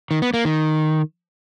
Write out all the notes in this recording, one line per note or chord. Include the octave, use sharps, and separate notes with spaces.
D#3
B3
A#3
D#3